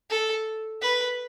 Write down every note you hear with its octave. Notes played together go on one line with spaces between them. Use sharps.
A4
B4